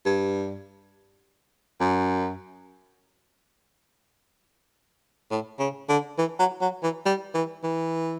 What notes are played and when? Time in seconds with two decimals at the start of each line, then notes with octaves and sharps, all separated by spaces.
0.06 G2
1.81 F#2
5.31 A2
5.59 C#3
5.89 D3
6.19 E3
6.39 F#3
6.62 F#3
6.83 E3
7.06 G3
7.35 E3
7.64 E3